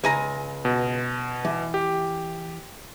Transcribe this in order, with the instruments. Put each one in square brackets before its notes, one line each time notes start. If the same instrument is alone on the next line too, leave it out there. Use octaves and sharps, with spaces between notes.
[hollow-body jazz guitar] C#2 G#5 A#5
[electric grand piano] B2
[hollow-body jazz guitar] E3
[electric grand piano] G4